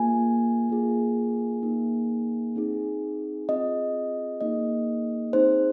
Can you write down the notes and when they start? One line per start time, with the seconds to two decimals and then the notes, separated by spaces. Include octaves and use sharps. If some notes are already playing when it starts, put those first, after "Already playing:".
Already playing: A#3 F4 G#4 G#5
0.69 A#3 F4 G#4
1.63 A#3 D#4 G#4
2.56 C4 D#4 G#4
3.49 C4 F4 G#4 D#5
4.41 A#3 D#4 G#4 D#5
5.33 C4 D#4 G#4 C5